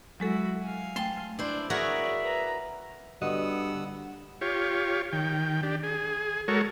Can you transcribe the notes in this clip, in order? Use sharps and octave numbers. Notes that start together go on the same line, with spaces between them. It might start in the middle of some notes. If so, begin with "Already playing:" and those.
F#3 G#3 E4 F#4 A4
F5 G#5
A3 G5 A5 C6
D4 E4 C5 D5
F#4 G#4 A#4 C#5 D5 E5
B4 A#5
G2 D3 B3 F#4 D#5 F#5 E6
F4 G4 C#5
D#3 G5
D4 G4
G#4
G#3 F#4 A4 A#4 C#5